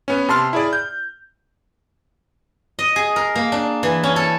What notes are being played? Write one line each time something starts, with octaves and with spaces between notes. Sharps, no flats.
B3 C#4
C3 A5 C6 F6
E4 G#4 D5
G6
D#5
G#4
A#4
A#3
D4
E3
C#4
A4